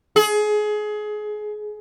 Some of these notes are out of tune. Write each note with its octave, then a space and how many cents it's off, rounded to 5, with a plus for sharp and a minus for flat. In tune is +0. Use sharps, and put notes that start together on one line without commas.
G#4 +25